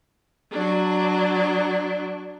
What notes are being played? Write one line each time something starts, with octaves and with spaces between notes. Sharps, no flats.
F#3 D4